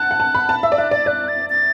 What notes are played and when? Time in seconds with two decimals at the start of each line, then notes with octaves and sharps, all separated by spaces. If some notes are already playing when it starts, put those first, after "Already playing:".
Already playing: F#5 A5 F#6
0.11 F#5
0.20 A5
0.35 B5
0.49 A5
0.63 E5 E6
0.72 D5
0.78 E5 F#6
0.91 D5 A6
1.06 D5 F#6
1.28 A6
1.50 A6